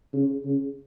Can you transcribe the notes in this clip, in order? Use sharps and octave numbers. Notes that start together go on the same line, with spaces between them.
C#3
C#3